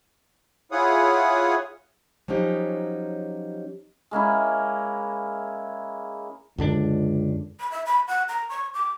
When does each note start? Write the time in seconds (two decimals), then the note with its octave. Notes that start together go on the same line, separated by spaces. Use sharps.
0.72 E4 F4 G#4 C#5 F#5 D#6
2.28 F3 F#3 C#4 D#4 G4
4.11 G#3 A#3 C#4 E4
6.58 C#2 F#2 D3 D4
7.60 B5
7.71 E5
7.86 B5
8.08 F#5
8.29 A#5
8.49 C#6
8.74 D6